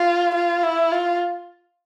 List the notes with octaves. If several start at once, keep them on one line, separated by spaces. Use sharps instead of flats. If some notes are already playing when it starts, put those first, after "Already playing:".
Already playing: F4
F4
E4
F4